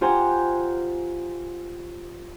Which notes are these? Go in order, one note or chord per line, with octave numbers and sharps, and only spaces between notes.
F4 G4 C5 F#5 G#5 A#5